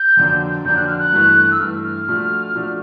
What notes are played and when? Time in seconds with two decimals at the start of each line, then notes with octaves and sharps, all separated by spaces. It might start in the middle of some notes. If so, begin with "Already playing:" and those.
Already playing: G6
0.17 F2 D3 F#3 A#3 D4
0.64 F2 D3 F#3 A#3 D4 G6
0.76 F#6
0.87 F6
0.98 F#6
1.13 G2 E3 A3
1.51 E6
1.60 G2 E3 A3 F6
1.83 F6
2.08 A#2 F3 A3 D4 F#4
2.56 A#2 F3 A3 D4 F#4